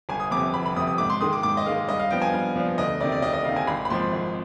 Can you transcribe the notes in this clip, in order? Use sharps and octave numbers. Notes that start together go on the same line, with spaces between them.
G1 G#5
D#6
F2 C3 D6
G1 B5
B5
F2 C3 D#6
D#6
G#2 D6
C6
D#3 G#3 D#6
D6
G#2 D6
D#5
D#3 G#3 F5
G2 D#5
F5
F3 B3 D4 G5
G#5
G2 F5
F3 B3 D4
D2 D#5
C3 D#3 D5
D5
D2 D#5
D#5
C3 D#3 F5
G#5
G#1 B5
B5
G#2 F3 C4 C6
G#1